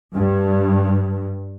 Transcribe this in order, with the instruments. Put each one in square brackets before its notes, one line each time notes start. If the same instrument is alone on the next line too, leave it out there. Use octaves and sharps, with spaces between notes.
[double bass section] G2